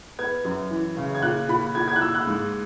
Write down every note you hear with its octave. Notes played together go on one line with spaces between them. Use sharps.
B3 G#6
F#2
E3
C#3
G#6
A#2 F#6
A#2 B5
A#2 G#6
G#6
F#6
A#2 E6
F#6
G#2